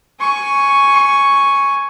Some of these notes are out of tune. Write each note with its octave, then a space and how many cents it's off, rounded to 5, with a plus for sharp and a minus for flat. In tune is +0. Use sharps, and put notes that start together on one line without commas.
G#5 +5 C#6 +0